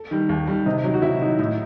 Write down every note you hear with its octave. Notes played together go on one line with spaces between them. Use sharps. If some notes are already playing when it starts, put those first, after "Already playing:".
Already playing: A4
D#3 G3
D#2
D#3 G3
C3 D#4
D#3 F#3
F#4
C3 E4
D#3 F#3 D#4
A2 D#4